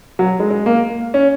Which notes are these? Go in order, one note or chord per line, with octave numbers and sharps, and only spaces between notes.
F#3
G#3
G#3
A#3
C#4